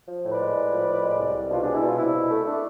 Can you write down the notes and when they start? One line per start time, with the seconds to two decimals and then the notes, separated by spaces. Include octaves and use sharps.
0.08 F3
0.24 A2
0.32 B4 D5
0.40 G#3
0.56 A2
0.72 F3
0.87 A2
1.03 G#3
1.19 C2
1.34 C2
1.51 B2 D4 F4
1.62 G#3 D4
1.74 E4
1.83 B2 D4 F4
1.97 C2 E4
2.14 B2
2.30 A3
2.45 A3 D4